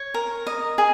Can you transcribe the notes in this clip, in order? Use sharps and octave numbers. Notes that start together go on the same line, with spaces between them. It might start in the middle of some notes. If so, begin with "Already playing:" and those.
Already playing: C#5
A#4
D#5
G#4